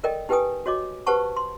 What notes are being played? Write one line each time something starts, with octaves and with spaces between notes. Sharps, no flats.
A4 A#4 D5 D#5 G5
D#4 G4 B4 G5 G#5 D#6
F#4 C#5 D#5 D6
G4 B4 C5 F#5 A5 C#6
C6